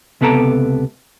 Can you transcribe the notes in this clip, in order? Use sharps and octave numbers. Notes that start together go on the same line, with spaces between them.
C#2 C3 B3 A4 G5 A#5